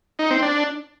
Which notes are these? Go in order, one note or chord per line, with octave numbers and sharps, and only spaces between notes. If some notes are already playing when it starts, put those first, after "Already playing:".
D#4
C4
D4